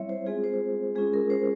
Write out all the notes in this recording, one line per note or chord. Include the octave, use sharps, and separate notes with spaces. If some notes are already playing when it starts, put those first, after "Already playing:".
Already playing: G3 C4 E4 C#5 E5
C5
G#3 C4 F4 G#4
C5
G#3 C#4 F4 G#4
A#4
C5